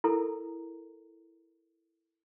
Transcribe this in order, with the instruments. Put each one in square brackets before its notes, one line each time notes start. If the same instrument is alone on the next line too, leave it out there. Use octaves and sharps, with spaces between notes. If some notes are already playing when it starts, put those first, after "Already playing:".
[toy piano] E4 A4 A#4 A#5